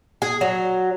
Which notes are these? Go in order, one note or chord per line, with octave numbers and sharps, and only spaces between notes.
G#4
F#3